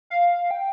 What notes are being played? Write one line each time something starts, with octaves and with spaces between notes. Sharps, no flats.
F5
G5